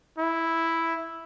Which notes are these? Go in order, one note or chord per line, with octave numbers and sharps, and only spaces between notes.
E4